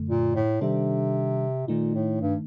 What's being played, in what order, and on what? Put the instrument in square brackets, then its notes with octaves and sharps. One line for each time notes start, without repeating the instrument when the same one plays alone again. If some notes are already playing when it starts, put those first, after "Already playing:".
Already playing: [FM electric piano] F#2 D3 A3
[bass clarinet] A#2
A2
[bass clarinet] C3 [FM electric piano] D#3 G3 D4 A4 C5
[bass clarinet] A#2 [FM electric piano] D#3 A3 D#4
[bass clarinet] A2
G2